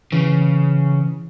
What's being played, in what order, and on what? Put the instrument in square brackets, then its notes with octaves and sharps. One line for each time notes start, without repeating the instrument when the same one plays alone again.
[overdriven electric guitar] C#3 [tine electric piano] E3